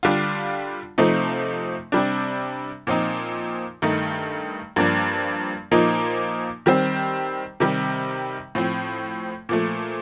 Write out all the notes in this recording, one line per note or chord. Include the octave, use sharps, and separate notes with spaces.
D3 G3 D4 F4
C3 F3 A3 D#4
C3 G3 D4
A#2 F3 C4 D#4
G2 D#3 A3 D#4
G2 F3 A#3 D4
A#2 F3 A#3 D#4
D#3 G3 C4
C3 D#3 G3
A2 F3 C4
A#2 F3 A3